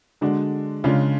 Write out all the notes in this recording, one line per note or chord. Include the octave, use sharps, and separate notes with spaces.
D3 G#3 D4 F#4
C#3 G#3 D4 F4